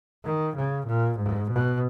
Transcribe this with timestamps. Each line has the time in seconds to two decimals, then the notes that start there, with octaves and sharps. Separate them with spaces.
0.24 D#3
0.56 C#3
0.87 A#2
1.19 G#2
1.50 B2